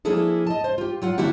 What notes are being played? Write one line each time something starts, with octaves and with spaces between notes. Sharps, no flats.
F3 A#3 D4 E4 G#4 A4
D#5 A5
C5
F4 G4
F#3 F4 F#5
D3 A#3 D4 E4 F#4 G4